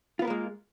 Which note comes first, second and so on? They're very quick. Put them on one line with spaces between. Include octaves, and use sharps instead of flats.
F4 B3 A#4 A#3 G#3